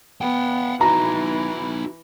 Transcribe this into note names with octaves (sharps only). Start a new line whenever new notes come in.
B3 F#5 G5
E3 D#4 F#4 A#5